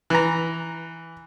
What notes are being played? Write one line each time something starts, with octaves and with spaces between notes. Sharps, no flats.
E3 A#5